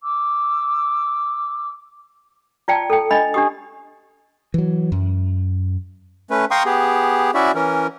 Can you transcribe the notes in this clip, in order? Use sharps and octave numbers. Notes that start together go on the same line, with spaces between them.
D6 E6
F4 D5 G5 A5
A4 G5
D4 D#5 B5
D4 G4 D#6
E3 F#3
F#2
A3 C#4 B4
F5 G5 A#5 C6 C#6 D#6
B3 G4 G#4
C#4 E4 F#4 D5 E5
E3 C#4 A#4